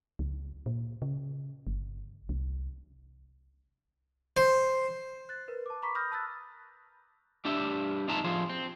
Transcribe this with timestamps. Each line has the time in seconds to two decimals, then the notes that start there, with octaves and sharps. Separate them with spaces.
0.19 C#2
0.66 A#2
1.02 C#3
1.67 G1
2.29 C2
4.37 C5
5.29 F#6 A6
5.48 A#4 B4
5.66 A5 D6
5.82 A#5 B5 C#6 D6 B6
5.95 B5 D#6 F6 G6 A#6
6.12 A5 B5 E6 F#6 A6
7.45 G3 D4 G4 E5
8.08 F2 G#3 D#4 E5 A5 A#5
8.24 F2 F3 G#4 C5
8.50 C4